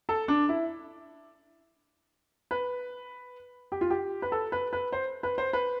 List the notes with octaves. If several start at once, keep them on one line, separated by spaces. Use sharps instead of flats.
A4
D4
E4
B4
G4
F4
G4
B4
A4
B4
B4
C5
B4
C5
B4